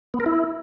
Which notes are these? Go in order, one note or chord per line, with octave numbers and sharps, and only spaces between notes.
B3
A#4
E4